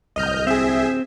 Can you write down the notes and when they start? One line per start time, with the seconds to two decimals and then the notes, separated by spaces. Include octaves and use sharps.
0.16 D1 C2 D#5 F6 G6
0.47 C4 G#4 E5